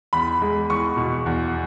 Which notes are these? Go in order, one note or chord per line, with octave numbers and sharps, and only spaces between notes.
E2 B5
G#3
E2 C#6
B2
E2